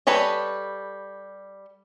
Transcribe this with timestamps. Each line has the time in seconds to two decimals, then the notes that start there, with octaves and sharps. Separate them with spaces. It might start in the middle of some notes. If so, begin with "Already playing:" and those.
0.07 G3 A4 B4 C#5 D#5